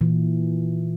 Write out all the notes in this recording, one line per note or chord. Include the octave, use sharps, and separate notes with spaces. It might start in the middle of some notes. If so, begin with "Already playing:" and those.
A#2 E3